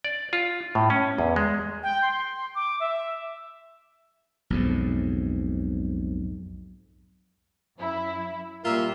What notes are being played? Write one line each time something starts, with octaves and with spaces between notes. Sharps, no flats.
D5
F4
A2
C#4
E2
G#3
G5
C6
D6
E5
B1 F2 G#2
F#2 E4
A#2 G3 F4 A#4 E5